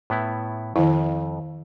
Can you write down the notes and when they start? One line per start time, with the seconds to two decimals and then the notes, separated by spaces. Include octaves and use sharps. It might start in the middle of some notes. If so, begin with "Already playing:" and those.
0.10 A2 B3 E4
0.76 F2 D#3 E4